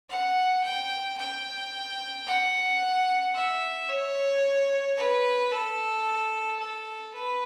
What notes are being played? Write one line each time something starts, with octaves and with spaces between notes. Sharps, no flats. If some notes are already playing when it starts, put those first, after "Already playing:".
F#5
G5
G5
F#5
E5
C#5
B4
A4
A4
B4